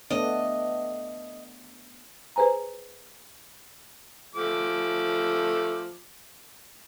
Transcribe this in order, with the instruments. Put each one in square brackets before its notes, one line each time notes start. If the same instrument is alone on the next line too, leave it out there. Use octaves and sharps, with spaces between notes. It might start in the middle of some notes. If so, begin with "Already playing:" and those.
[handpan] A3 B3 D4 [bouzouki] D#5
[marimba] G#4 B4 C5 G#5 A#5
[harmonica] F3 A3 D6